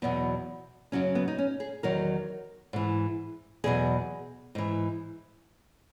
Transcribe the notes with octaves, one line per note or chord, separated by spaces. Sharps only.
E2 B2 F#3 B3
F#2 C#3 F#3 C#4
B3
D#4
C#4
G#4
E2 D#3 F#3 A#4
G#2 E3
E2 B2 F#3 G#4
G#2 E3